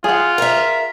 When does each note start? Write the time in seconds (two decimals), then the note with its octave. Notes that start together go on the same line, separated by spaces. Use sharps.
0.04 F4 G#4 F#5
0.38 A#4 E5